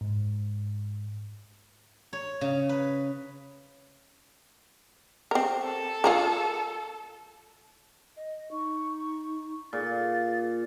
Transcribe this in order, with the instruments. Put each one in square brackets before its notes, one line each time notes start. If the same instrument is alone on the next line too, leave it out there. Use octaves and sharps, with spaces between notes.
[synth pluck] G#2
[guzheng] C#5
C#3
B4
[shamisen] C4 A#4
[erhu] A4
[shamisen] F4 G#4 A#4
[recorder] D#5
[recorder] D#4 [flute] C#6
[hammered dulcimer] A#2 [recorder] G#4 [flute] A6